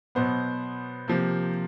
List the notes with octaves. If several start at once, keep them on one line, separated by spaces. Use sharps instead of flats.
B2 F#3 B3 C5
C3 F3 A#3